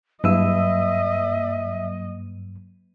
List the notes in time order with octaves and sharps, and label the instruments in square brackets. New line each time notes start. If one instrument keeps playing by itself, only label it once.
[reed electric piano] G2 E6 [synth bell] F#3 A#3 D#7 [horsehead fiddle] D#5 [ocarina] E5